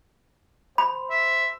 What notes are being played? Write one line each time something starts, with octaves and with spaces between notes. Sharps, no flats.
C5 B5
E5